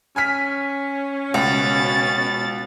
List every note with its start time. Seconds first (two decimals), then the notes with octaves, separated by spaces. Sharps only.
0.16 C#4 G#5 F6 B6
1.34 C#2 B2 F#4 A6